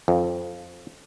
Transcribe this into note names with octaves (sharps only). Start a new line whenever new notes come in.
F2